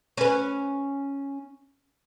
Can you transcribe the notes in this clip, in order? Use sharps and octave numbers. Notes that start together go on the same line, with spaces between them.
C#4 B4